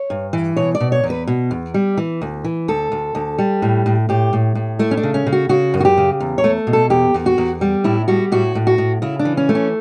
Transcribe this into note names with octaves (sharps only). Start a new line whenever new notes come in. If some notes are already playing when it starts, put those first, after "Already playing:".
Already playing: C#5
G2
E3
B2 C#5
D5
B2
C#5
E2
B4
B2
E2
G3
E3
D2
E3
D2 A4
D2
D2
G3
A2
A2
A2 G4
A2
A2
A3 E4
C#4
D4
C#3
C#4
C#3
F#4
C#3 F#4
F#2
F#4
G4
C#3
E2
C#5
A3
B2
A4
E2 G4
E2
F#4
E2
G3
A2 E4
G3 F#4
A2 F#4
A2
F#4
A2
C#3 E4
D4
E3
C#4
A3
C#4